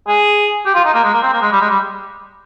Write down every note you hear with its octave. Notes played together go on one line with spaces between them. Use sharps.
G#4
G4
F4
D#4
A#3
G#3
A#3
C4
A#3
G#3
G3
G#3
G3